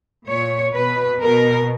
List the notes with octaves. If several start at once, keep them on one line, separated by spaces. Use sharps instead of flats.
A#2 C#5
B2 B4
B2 A#4